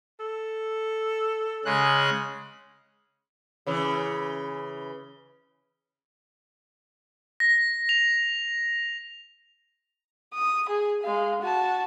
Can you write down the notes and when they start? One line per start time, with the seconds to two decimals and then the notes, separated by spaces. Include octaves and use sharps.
0.20 A4
1.65 C#3 G#3 F#6
3.67 C#3 E3
7.40 A#6
7.89 F7
10.34 D#6
10.69 G#4
11.03 G#3 F5
11.42 F#4 A5